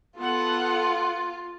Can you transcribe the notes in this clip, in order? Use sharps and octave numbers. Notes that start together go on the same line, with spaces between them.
B3 F4 A4 F#5